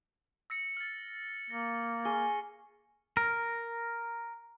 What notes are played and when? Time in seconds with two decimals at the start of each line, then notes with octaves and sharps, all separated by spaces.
0.50 E6 A#6 C#7
0.77 F6 A6
1.50 A#3 A#6
2.05 G#4 C#6 G7
3.17 A#4